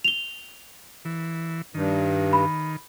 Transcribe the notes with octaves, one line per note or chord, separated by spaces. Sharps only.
F7 G7
E3
G2 D#3
B5